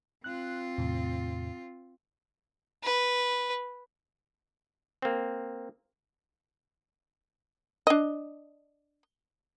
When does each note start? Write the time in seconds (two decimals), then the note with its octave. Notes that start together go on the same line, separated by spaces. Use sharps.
0.24 C4 F4 F#6
0.78 E2 A2 C3
2.83 B4
5.02 A#3 C4
7.87 D4 D#5